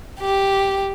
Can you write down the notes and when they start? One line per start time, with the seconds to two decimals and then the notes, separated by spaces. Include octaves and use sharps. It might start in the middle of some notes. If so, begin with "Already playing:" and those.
0.20 G4